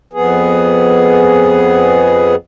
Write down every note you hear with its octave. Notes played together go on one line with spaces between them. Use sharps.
F2 B3 G#4